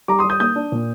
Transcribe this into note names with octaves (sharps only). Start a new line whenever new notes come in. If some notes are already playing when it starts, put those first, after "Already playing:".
G3 A#5 D6
C6 D#6
G3
D#6 G6
A#3 D#6 G6
D4
A#2